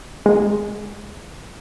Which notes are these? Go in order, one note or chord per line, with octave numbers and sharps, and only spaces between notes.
G#3